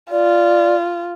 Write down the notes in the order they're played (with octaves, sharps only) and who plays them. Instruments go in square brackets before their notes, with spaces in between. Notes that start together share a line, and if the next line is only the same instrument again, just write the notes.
[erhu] F4 [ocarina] D5